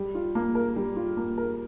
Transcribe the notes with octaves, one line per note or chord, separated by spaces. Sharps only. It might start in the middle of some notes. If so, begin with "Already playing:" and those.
Already playing: G3
F4
A#3
A#4
G3
F4
A#3
A#4